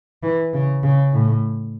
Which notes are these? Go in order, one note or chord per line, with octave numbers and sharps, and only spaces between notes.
E3
C#3
C#3
A2